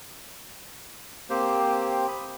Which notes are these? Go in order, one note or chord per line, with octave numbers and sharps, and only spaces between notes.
A#3 C4 G4 C5
B5 D#6